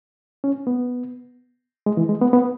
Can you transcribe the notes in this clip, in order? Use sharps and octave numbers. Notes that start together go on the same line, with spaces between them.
C#4
B3
G#3
E3
G#3
B3
B3